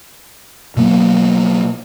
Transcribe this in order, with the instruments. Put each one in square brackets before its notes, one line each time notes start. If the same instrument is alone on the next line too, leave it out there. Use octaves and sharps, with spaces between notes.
[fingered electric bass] B2 F#3 A#3 B3